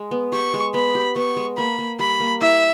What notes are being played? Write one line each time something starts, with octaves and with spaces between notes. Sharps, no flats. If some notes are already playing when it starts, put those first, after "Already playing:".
Already playing: G#3
B3
G4 C#6
G#3
B3 B5
G4
B3 C#6
G#3
A#3 B5
A#3
G3 B5
A#3
E4 E5